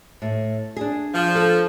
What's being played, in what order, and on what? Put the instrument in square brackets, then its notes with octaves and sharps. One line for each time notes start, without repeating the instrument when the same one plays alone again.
[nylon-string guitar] A2
D4 G#4
[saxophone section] F3
[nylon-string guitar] A4